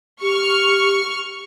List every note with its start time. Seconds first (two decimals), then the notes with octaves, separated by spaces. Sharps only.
0.21 G4 C#6 F6